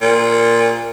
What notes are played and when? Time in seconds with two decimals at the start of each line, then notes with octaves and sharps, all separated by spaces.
0.01 A#2